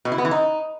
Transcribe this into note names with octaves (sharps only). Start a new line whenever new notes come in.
B2
E4
B3
E3
D#4